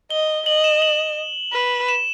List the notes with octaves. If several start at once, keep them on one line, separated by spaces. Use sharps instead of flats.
D#5 G7
D#5 F#7
E7
F#7
B4
E7